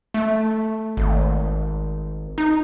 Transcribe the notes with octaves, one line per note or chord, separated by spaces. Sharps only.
A3
G#1
D#4